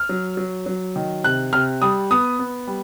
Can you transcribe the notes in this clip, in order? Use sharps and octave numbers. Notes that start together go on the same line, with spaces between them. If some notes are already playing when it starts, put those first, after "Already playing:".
Already playing: F6
F#3
F#3
F#3
D#3
C3 F#6
C3 F6
G3 D#6
B3 D#6
B3
G3